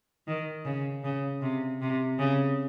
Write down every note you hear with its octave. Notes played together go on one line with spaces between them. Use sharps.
D#3
C#3
C#3
C3
C3
C#3